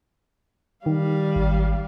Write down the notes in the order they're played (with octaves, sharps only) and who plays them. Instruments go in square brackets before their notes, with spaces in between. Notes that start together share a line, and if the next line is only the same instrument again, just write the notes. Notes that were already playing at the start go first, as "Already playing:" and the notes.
[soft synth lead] D#3 [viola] G3 F5
[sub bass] G#1